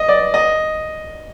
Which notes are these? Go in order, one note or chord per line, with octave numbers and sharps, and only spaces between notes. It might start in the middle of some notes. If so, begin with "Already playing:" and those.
Already playing: D#5
D5
D#5